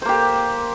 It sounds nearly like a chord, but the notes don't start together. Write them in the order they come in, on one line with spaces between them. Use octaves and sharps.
C5 A#3 G4